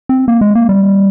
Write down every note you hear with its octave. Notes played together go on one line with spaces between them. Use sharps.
C4
A#3
G#3
A#3
G3